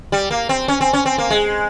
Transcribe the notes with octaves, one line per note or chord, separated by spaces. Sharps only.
G3
A#3
C4
C#4
C4
C#4
C4
A#3
G#3